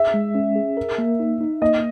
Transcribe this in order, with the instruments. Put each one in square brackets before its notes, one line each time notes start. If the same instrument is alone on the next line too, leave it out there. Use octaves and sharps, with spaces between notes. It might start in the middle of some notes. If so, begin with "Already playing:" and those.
Already playing: [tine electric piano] G#4 [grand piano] E5
[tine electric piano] G#3
C#4
G#4
A#4
A#3
D#4
D#4
[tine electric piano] A#3 [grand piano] D#5